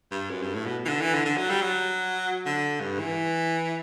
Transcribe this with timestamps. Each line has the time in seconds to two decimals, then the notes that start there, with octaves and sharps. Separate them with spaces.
0.11 G2
0.30 F#2
0.42 G2
0.54 A2
0.66 B2
0.85 E3
0.89 D3
1.01 E3
1.14 D3
1.25 D3
1.37 F#3
1.49 G3
1.62 F#3
2.46 D3
2.80 G2
2.99 E3